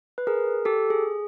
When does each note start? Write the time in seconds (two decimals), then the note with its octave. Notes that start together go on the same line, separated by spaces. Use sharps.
0.18 B4
0.27 G#4 A#4
0.65 G4 A4
0.90 G#4